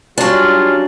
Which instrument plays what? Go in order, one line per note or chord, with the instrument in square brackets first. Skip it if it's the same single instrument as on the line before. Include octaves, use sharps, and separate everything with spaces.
[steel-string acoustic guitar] F#3 D4 [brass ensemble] G3 C#4 F4